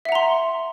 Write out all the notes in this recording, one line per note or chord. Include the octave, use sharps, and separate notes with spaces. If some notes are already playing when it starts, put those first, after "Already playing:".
E5 F#5 A#5 C6